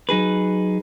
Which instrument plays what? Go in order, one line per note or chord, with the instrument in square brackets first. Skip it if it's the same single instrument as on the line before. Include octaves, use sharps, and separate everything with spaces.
[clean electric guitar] F#3 D#4 G#4 B4